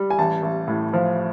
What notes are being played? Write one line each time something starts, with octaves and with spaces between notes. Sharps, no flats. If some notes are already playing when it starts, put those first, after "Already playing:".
Already playing: G3
G#5
A1 A5
A1
A2
F3